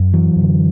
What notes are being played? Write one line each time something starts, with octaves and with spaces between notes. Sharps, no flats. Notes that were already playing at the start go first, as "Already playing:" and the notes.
Already playing: F#2
E3 F#3
F#2
D3